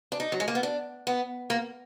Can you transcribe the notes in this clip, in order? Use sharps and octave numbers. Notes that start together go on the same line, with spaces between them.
D4
D#4
F#3
G#3
A#3
B3
D4
B3
A#3